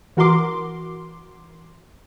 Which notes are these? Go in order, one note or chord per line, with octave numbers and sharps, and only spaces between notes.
E3 F#4 A#4 C6 D6